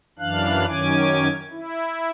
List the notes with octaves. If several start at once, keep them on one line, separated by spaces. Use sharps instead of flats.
F#2 E3 D4 F5 F#6
F#2 D#3 C#4 G#5 D6
E4